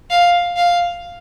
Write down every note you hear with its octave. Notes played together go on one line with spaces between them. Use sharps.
F5
F5